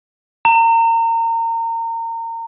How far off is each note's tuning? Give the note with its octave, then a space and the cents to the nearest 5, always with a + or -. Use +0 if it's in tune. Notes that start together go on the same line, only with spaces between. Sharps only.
A#5 -30